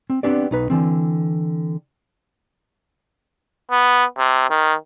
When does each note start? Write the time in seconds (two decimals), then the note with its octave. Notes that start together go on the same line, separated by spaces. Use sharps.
0.10 C4
0.23 B3 C4 D4 G4 D5
0.51 B1 D#4 B4
0.70 D3 E3 C4
3.71 B3
4.18 C3
4.50 D#3